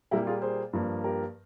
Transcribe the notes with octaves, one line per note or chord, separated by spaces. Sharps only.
A#2 G3 A#3 E4 G4
F4 G#4
G#4 C5
G2 F3 A#3
G4 A#4